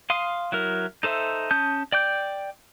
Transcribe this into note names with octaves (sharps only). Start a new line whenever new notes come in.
F5 C6 D#6
F#3 E4 A#4
D#4 A4 C5 E5
C#4 A5 D#6 G6
D5 G5 D6 G6